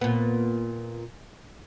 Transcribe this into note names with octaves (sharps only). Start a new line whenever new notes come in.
A#2 B3